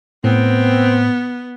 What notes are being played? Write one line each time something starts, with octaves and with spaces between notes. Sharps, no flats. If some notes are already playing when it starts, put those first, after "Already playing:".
A2 B3 C4